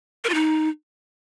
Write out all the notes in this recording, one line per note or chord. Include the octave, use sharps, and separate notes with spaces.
A#4
F4
D#4